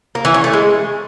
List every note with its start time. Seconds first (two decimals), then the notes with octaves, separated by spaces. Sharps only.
0.15 A#3
0.25 E3
0.34 C#4
0.44 A3
0.53 G#3